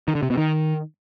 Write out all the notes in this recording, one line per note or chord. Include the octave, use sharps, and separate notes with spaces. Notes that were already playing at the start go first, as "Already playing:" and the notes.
D#3
D3
C3
B2
D#3